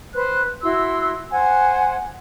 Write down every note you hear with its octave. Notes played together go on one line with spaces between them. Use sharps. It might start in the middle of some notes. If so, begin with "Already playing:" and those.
B4 C5 F#6
E4 F#4 C6 E6
C5 F#5 G#5